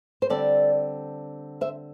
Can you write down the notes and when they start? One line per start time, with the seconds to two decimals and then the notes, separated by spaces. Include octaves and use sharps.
0.22 C5
0.30 D3 G3 C4 A4 D5
1.61 C5 E5